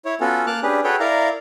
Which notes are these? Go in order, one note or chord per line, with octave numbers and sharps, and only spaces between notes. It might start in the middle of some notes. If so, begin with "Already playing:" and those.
E4 C#5
B3 C#4 F4 F#4 A4
A#3 A5 D6 F6 F#6
C#4 D4 G4 G#4 B4
F#4 G#4 A4 B4 C#5 G5
E4 A#4 D5 F5 A#5